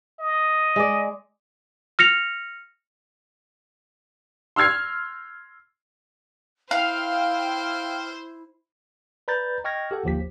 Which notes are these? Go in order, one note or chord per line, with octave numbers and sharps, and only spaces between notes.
D#5
G#3 D5
F6 A#6 C#7 F7
C6 E6 F6 G#6 C7
E4 C5 F5 G5 F6
B4 D5 A#5 B5 G6 A6
D#5 G5 C#6 F6 G#6 A#6
G4 A4 F#5
G1 D#2 F3 G4 B6